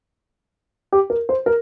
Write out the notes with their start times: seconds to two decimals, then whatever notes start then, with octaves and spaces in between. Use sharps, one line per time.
0.92 G4
1.10 A#4
1.29 C5
1.46 A#4